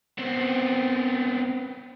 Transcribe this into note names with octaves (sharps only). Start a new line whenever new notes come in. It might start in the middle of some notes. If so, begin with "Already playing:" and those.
B3 C4